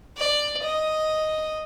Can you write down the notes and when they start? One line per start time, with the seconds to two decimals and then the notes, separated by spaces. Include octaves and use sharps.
0.17 D5
0.63 D#5